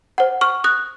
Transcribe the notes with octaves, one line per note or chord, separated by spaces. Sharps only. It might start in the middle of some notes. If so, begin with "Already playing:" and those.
C5 F#5
C#6 F6
D#6 F#6